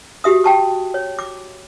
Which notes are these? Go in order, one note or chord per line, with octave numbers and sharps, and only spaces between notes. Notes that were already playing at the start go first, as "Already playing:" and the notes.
F#4 G4 E5 D#6
G5 A5 C#6
C#5
D6